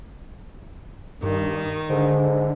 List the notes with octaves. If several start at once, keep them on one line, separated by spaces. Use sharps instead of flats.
G2 D#3
G#2 D3